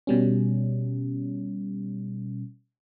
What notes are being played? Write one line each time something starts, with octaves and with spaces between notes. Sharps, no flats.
B2 G3 C#4